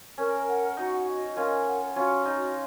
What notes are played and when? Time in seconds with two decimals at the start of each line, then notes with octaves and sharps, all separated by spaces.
0.18 C#4 A#4
0.48 F#5
0.77 D#4 F#4
1.08 D#5
1.36 C#4 F4 A#4
1.67 F#5
1.96 C#4 F4 F#4
2.25 D#4 D#5